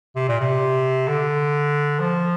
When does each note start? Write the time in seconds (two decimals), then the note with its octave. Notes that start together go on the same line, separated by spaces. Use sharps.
0.16 C3
0.28 A#2
0.40 C3
1.08 D3
2.00 F3